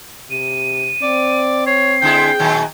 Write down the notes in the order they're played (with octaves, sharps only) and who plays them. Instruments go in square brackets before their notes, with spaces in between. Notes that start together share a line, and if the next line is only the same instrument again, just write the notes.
[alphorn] C3 [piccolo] D#7
[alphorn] C4 [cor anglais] D5
[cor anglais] C#5 [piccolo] C7
[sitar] D3 G#3 E4 [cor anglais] G5
[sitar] A#2 D#3 F#3